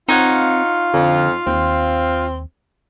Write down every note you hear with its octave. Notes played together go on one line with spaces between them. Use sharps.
C4 D#4 F4 C#5 F5 F#5
F2 D3
D#2 C4